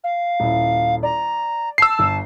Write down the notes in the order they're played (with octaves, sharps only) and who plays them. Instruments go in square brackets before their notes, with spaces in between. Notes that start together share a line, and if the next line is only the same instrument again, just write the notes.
[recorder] F5
[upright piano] D#1 E4
[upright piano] D5 [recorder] A#5
[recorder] A5 [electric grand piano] E6 C7
[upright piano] G1